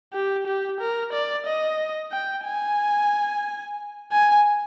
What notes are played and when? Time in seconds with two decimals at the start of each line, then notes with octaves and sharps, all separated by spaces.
0.13 G4
0.47 G4
0.80 A#4
1.13 D5
1.46 D#5
2.12 G5
2.45 G#5
4.12 G#5